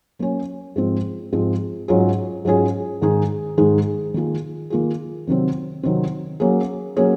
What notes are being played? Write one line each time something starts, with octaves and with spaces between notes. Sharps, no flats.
F#3 A#3 C#4
G#2 F3 G#3 C4
G#2 F3 G#3 C4
G#2 F#3 C#4 F4 G#4
G#2 F#3 C#4 F4 G#4
G#2 D#3 G#3 D#4 G#4
G#2 D#3 G#3 D#4 G#4
D#3 A#3 F4 G#4
D#3 A#3 F4 G#4
C3 D#3 F#3 C4
C3 D#3 F#3 C4
F#3 A#3 C#4 G#4
F#3 A#3 C#4 G#4